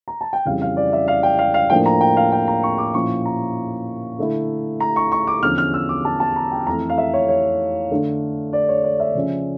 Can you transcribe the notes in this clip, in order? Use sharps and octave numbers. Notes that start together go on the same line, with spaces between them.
A#5
A5
G5
F2 C#3 E3 G3 C#4 F5
F5
D5
E5
F5
G5
F5
F5
A2 F3 A#3 D4 G5
A#5
G5
F5
G5
A#5
C#6
D6
A#2 F3 C#4 E4 C#6
A#5
D3 A3 E4
A#5
C#6
C#6
D6
E2 D3 F3 C#4 F6
F6
E6
D6
A5
A5
A#5
G5
F2 E3 A3 A#5
F5
E5
C#5
C#5
D3 A3 D4
D5
C#5
D5
E5
C#3 F3 C#4